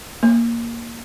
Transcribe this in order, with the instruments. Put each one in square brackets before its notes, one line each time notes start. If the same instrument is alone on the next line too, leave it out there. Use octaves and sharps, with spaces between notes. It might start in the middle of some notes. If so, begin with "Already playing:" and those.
[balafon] A#3